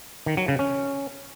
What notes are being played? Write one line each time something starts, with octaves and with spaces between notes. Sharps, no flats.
D#3
F#3
C#3
C#4